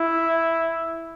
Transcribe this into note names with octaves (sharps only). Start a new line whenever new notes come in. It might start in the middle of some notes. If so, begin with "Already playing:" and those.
Already playing: E4